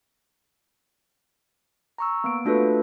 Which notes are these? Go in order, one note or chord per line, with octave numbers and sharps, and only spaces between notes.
A#5 C#6 E6
A#3 B3 D7
A3 D4 F4 F#4 A4 B4